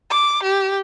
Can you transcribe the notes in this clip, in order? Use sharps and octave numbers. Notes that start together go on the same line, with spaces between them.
D6
G4